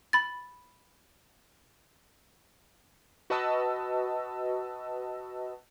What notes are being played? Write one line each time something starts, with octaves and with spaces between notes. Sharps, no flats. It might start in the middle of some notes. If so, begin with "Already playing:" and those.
B5 A6
F#4 B4 D#5 A5 E6